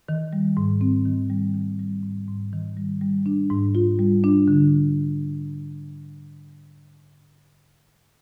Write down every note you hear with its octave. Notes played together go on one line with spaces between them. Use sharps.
D#3
G3
G#2
C4
D#3
G3
D#3
G3
G#2
G#2
D#3
G3
G3
D4
G#2
F4
G3
D4
D3